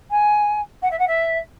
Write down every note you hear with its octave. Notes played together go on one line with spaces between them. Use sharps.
G#5
F#5
E5
F#5
E5